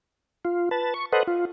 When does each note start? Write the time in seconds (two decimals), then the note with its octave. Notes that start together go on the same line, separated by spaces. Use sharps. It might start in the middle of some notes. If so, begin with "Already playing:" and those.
0.45 F4
0.71 B4 A5
0.94 C#6
1.13 A4 B4 C5 D#5 F#5
1.28 F4